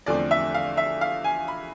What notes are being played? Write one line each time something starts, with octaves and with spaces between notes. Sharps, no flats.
E2 D3 F3 A3 C4 D5
E5
F5
E5
F5
G#5
B5